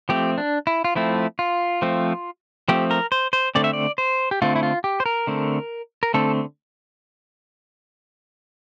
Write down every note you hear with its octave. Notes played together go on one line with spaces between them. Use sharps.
F3 A3 C4 G4
D4
E4
F4
F3 A3 C4 E4
F4
F3 A3 C4
F3 A3 C4 G4
A#4
C5
C5
D3 A3 C4 D5
E5
D5
C5
G4
D3 A3 C4 F4
E4
F4
G4
C5
A#4
D3 A3 C4
A#4
D3 A3 C4 A4